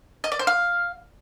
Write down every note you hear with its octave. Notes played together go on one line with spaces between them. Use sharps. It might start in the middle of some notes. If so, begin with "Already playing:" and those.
D#5
D5
C5
F5